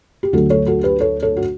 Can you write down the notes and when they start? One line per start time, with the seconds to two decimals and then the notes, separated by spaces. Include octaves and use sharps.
0.23 G4
0.33 D2 D3 F#3 F#4 A4
0.50 A4 C#5
0.66 F#4 A4
0.83 G4 B4
1.00 A4 C#5
1.22 A4 C#5
1.37 F#4